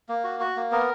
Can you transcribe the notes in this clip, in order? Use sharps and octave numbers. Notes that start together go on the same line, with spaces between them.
A#3
F#4
F#4
A#3
B3 A#4